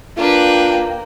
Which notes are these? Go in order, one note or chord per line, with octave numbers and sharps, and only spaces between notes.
A#3 D4 F4 B4 G5